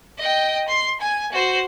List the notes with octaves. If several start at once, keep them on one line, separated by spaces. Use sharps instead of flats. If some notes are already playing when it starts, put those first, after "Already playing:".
D#5 G5
C6
G#5
F#4 C5